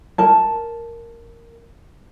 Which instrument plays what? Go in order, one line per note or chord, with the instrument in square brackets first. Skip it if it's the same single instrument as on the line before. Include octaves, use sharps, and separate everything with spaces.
[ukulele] A#4 A5